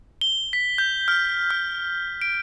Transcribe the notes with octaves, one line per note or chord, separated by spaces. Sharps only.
G7
B6
G6
F6
F6
D7